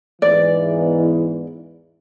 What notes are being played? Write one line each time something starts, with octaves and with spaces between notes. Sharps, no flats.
E2 G#2 E3 D5